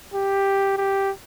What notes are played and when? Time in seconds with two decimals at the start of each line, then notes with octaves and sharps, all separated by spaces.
0.14 G4
0.77 G4